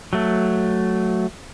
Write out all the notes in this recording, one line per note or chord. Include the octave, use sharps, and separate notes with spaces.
F#3 A3